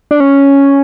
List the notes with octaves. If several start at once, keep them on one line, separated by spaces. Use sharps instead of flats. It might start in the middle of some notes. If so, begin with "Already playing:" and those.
D4
C#4